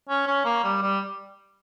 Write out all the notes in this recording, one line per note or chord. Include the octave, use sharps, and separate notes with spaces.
C#4
C#4
A#3
G3
G3